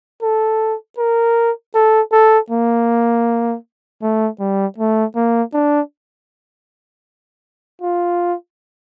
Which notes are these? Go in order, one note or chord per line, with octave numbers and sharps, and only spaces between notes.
A4
A#4
A4
A4
A#3
A3
G3
A3
A#3
D4
F4